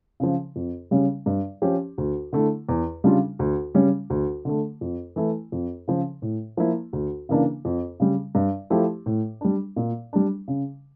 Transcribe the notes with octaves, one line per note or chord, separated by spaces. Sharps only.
C#3 F3
F2
C#3 G3 C#4
G2
F3 C#4 G4
D2
D3 A3 E4
E2
C#3 G3 D4 F4
D2
C#3 G3 C#4
D2
D3 A3
F2
E3 A3 E4
F2
C#3 F3
A2
F3 A#3 E4
D2
C#3 E3 A#3 D4
F2
C#3 G3
G2
F3 A3 E4 G4
A2
G3 D4
A#2
G3 D4
C#3